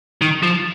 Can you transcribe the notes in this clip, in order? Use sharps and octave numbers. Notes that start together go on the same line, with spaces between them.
D#3
F3